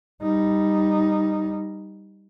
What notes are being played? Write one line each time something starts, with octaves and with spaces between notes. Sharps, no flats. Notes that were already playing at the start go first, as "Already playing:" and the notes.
G3 D#4